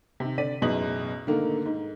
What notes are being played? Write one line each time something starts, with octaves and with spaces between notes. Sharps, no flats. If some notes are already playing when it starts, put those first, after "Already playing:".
C3 D#3
D3 D5 B6 D#7
A1 F#2 B2 D#4 G#4 F#7
G#2 D3 D#3 A3 A#3
G#2